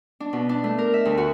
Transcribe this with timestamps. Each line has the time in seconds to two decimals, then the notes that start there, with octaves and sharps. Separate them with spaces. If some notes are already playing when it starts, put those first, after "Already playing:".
0.20 D4
0.33 B2
0.49 D4
0.64 A3
0.78 A#4
0.94 E5
1.05 D2
1.18 F#4